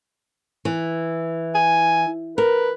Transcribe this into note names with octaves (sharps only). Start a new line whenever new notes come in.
E3
G#5
A#4 B4